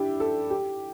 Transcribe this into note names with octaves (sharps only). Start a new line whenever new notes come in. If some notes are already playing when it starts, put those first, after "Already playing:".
Already playing: D4 E4 G4
A4
G4